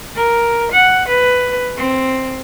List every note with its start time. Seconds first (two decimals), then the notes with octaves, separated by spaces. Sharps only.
0.16 A#4
0.72 F#5
1.08 B4
1.77 C4